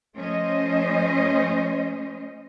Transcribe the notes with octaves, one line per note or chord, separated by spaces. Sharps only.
F3 A3 C#4 C5 D#5